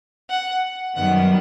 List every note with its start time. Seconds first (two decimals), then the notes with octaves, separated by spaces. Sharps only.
0.29 F#5
0.95 F#2 D#3 G3 B3 F#5